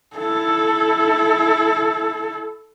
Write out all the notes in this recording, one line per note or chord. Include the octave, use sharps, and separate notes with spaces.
E4 A4